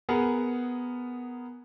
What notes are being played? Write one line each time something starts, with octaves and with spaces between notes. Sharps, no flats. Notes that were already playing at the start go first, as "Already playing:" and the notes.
B3 G#4 A#4 F#5